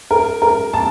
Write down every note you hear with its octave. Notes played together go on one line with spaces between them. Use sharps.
A#4
A#4
A5